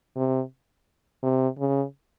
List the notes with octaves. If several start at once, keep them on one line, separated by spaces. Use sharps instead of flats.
C3
C3
C#3